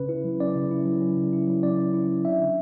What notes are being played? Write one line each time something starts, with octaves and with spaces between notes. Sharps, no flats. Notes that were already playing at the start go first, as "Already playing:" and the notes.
Already playing: C#3 C#4 B4
E4
F#3
C#4 D5
C#3
E4
F#3
C#4
C#3
E4
F#3
C#4 D5
C#3
E4
F#3
D4 E5
D3